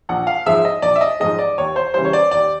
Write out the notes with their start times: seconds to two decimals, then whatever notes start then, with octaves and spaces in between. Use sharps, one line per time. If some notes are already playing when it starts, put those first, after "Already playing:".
0.09 A#1 F#5
0.27 F5
0.46 G#2 F3 G#3 E5
0.65 D#5
0.82 A#1 D5
0.96 E5
1.01 D#5
1.20 G#2 F3 G#3 D#5
1.39 D5
1.58 D#2 C#5
1.76 C5
1.94 C#3 E3 G3 C5
2.05 C#5
2.13 D5
2.31 D#2 D5